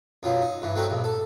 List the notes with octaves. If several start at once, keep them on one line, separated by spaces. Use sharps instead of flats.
F#2 B2 F3 F#3
D#4
G2 E3
F#3 A3 C4 D#4 F#4
A#1 G2
A4